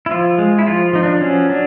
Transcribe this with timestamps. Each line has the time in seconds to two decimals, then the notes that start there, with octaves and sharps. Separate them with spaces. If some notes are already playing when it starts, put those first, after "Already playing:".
0.06 E4
0.11 F3 F4
0.38 G#3
0.59 E4
0.67 F3 F4
0.93 F3 D#4
1.03 D4
1.21 F#3 C#4
1.49 F#3 D4